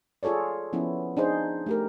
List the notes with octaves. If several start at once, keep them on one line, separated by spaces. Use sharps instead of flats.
F4 G#4 A4 C#5 D5
F3 B3 C#4 E4
D4 D#4 G#4 C5
A3 G4 A#4